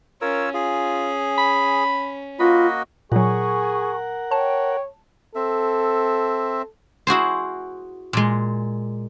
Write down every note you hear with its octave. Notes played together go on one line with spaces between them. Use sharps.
C#4 F4 A#4 C#5 E6
F4 G#4
B5
A#3 F4 F#4 D#5 B5
A#2 F#3 G#4 A#4 F#5 G#5 C#6
C#5 G5 A5
C4 A4 E5
E4 F#4 G#4 C5
A#2 G#3